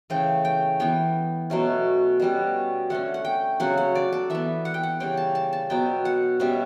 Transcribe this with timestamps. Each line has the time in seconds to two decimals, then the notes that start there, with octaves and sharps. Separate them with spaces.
0.10 C#3 E3 A3 C#4 G5
0.45 G5
0.80 E3 B3 G5
1.50 B2 F#3 A3 C#4
2.20 B2 G3 C#4
2.90 D3 A3 C#4 F#5
3.14 F#5
3.25 G5
3.60 C#3 F#3 C#4 F#5
3.78 F#5
3.95 D5
4.13 A4
4.30 E3 B3 E5
4.65 F#5
4.74 G5
4.83 F#5
5.00 C#3 G3 C#4 G5
5.17 A5
5.35 A5
5.53 A5
5.70 B2 F#3 B3 G5
6.05 F#5
6.40 B2 G3 C#4 E5